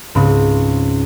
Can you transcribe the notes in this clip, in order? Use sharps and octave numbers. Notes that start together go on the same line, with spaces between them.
C#2 G#2 C4 B5